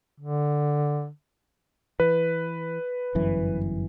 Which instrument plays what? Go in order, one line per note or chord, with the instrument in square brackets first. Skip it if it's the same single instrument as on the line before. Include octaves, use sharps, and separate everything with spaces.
[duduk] D3
[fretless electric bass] E3 [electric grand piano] B4
[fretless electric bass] G1 F#2 E3